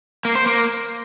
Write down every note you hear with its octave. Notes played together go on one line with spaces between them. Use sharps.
A#3
C5
A#3